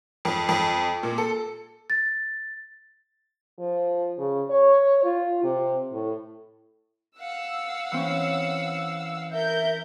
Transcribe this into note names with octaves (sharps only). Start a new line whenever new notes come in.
F2
F2
A#2
A4
A6
F3
C#3
C#5
F4
C3
A2
F5 F#5 E6
E3 C4 C#4
A#4 E5 G6